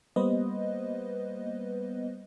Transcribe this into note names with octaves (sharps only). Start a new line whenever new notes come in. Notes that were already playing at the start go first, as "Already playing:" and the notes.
G3 A#3 B3 B4 C5 D#5